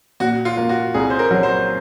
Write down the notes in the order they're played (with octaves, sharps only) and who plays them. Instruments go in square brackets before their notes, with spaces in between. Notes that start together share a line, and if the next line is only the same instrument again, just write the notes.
[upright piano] A#2 [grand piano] F#4
[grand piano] F4
[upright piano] A#3
[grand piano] F#4
[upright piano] C2 [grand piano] G#4
[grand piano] C5
A#4
[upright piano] F#3
[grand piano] C5